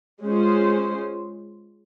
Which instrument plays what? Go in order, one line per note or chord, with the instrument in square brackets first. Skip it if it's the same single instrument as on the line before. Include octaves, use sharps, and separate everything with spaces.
[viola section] G#3 C#4 F4 C5